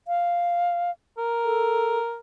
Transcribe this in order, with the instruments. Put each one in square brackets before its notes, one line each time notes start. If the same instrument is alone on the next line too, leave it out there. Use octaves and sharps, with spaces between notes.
[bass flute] F5
[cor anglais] A#4
[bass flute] A4